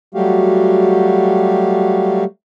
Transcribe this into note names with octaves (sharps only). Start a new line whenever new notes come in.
F#3 G3 A3 F#4 G4 F5